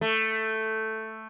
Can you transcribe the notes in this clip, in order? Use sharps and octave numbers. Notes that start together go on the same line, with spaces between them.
A3